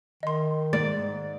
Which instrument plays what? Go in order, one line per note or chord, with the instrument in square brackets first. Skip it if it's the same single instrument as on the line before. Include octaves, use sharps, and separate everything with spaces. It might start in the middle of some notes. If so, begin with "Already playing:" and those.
[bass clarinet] D#3 [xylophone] D#5 C6
[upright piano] G#2 [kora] D5 [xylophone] A6